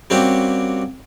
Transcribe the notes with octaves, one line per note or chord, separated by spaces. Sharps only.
G3 A#3 C4 C#4 F#4 G4